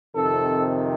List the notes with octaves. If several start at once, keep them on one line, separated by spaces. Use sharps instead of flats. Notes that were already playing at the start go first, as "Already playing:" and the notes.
F2 C3 D#3 A4